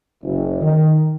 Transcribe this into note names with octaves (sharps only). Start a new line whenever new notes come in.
F#1
D#3